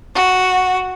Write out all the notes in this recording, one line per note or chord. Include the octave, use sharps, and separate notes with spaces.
F#4